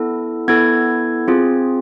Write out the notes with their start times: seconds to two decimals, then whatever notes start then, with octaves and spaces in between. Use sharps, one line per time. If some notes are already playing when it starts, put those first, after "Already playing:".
Already playing: B3 E4 A4
0.48 B3 E4 A4 G#6
1.28 C4 F4 G#4